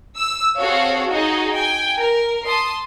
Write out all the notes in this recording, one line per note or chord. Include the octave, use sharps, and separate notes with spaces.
E6
C4 F#4 G#4 A4 C#5 F5
D#4 F#4 G#4 D#5
G5 G#5
A#4
A5 C6 D#6